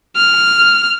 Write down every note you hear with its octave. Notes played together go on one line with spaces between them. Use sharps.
F6